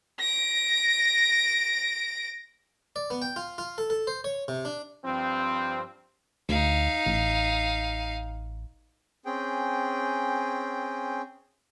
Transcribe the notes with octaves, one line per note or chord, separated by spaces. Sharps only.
A#6 D7
D5
B3
G5
F4
F4
A4
A4
C5
C#5
C3
D4
G2 F3 C4
D2 D#4 F5
A1
C4 C#4 G#4 G5